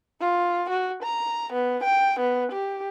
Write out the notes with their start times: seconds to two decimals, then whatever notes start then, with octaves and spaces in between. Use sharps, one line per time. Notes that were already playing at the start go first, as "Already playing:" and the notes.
0.21 F4
0.70 F#4
1.04 A#5
1.53 B3
1.84 G5
2.20 B3
2.52 G4